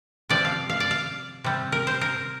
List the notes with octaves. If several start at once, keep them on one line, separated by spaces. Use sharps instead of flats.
C3 F3 D5
F5
F5
D5
F5
C3 G3
A#4
C5
A#4